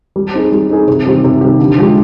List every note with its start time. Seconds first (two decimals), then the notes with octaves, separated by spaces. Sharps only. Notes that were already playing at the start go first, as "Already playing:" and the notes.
0.16 G3
0.34 C4 D#4 G#4
0.52 G3
0.70 C4 D#4 G#4
0.88 C3
1.06 D#3 G3 C4 G4
1.24 C3
1.41 D#3 G3 C4 G4
1.59 D3
1.78 F3 G#3 D4 G4